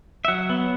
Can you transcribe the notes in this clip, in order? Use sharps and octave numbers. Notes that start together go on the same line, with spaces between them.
E5
F#3 F#5
B3